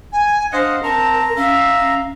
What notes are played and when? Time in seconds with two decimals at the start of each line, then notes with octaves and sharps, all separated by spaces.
0.12 G#5
0.52 D4 C5 D#5 F5 F#5
0.83 C4 A#4 A5 A#5
1.37 C#4 E5 F5